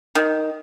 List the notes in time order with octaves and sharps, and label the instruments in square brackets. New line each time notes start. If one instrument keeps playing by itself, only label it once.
[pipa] D#3